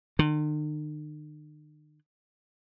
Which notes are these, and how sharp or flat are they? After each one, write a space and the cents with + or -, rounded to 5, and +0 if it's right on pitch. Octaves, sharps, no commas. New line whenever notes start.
D#3 -45